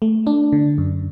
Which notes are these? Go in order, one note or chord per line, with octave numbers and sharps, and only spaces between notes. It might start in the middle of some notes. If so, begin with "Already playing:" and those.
A3
D4
D3
F#2